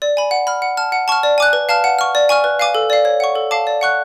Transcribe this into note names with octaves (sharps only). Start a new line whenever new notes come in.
D5
G#5 B5
F#5
B5 F6
F#5
A5 F6
F#5
A5 C#6 F6
D5
G#5 D6 F#6
B4
F5 A5 F6
F#5
C#6 F6
D5
G#5 C#6 F6
B4
F5 G#5 D6
A4
D5 F5
C#5
F#5 C#6
A4
F5 A5 D6
D5
F#5 C#6 F#6